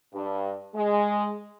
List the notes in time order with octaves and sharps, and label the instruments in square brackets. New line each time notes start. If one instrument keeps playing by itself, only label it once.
[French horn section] G2
G#3